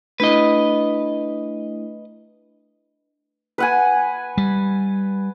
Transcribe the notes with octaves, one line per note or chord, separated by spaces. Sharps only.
A3 D4 E4 B4 D#5
B4 F#5 G#5
G3